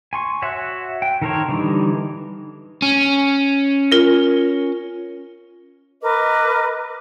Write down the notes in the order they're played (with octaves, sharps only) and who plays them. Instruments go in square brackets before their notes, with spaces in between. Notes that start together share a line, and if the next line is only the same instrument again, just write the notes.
[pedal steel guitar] G#5 C6 C#6
F#4 C#5 E5 F#5
G5
D#3 A4 A#4 C5 C#5
D3 E3 G3 D#4
[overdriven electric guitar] C#4
[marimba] F4 A#4
[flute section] A#4 B4 D#5 D6